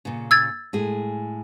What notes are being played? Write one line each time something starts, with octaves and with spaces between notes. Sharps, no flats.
A#2 C#3
E6 G#6 A6
A2 G#3 G#4